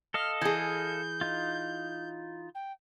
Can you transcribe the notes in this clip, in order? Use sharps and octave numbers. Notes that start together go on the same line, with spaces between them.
A4 D#5 F5 F6
E3 G#4 G6
D#4 F4
G5